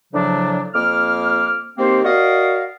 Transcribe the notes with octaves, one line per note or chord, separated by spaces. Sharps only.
A2 C#3 F3 F#3 D4
F2 A#3 D6 F6
D#3 A#3 C4 G4 C5
F#4 A#4 D5 D#5 F5